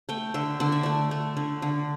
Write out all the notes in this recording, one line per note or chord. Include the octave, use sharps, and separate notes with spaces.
A3 G5
D3 E5
D3 D5
E5
A3 D5
A3
D3
D3